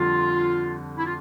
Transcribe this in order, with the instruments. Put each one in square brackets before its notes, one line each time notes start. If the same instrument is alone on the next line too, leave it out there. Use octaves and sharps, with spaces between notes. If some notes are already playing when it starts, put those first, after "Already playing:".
Already playing: [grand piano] F2 D3 G3 [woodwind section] F4
[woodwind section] E4
F4